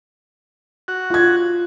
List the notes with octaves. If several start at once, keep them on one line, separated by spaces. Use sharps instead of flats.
F#4
F4 G#6